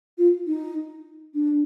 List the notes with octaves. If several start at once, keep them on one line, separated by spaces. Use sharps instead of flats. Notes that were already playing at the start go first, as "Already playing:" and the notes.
F4
D#4
D4